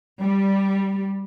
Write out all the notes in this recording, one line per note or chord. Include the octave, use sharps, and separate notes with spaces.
G3